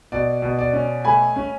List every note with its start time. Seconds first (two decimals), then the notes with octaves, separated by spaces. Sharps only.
0.12 B2 D5
0.42 B2
0.59 D5
0.73 C#4
1.05 A3 G#5 B5
1.36 C#4